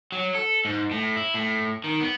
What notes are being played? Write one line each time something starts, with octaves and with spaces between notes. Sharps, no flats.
F#3
A4
G#2
A2
E4
A2
D#3
B3